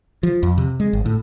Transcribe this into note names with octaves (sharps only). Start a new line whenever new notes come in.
F3
F2
C3
G#3
G#1
A2